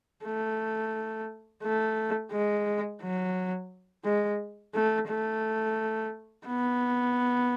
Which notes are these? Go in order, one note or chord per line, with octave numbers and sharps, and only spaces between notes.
A3
A3
G#3
F#3
G#3
A3
A3
B3